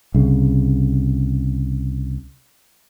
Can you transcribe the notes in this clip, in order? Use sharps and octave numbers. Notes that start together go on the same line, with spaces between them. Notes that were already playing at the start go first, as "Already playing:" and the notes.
C2 C#3